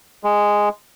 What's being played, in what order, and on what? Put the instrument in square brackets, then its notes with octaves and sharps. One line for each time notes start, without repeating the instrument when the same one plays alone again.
[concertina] G#3